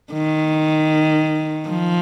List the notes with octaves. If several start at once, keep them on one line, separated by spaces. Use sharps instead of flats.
D#3
F3